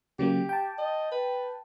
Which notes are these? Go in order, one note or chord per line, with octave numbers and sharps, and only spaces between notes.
C#3 F#3 A#3 G4
G5 A5
D#5
B4